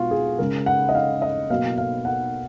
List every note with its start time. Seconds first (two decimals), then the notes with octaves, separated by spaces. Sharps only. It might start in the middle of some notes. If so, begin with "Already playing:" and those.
Already playing: B2 G#3 F4 F#4
0.11 G#4
0.39 C#3 G#3 A#4
0.66 F#5
0.89 D#5
0.95 F5
1.22 D#5
1.50 B2 F#3 A#3 F5
1.78 F5
2.05 F#5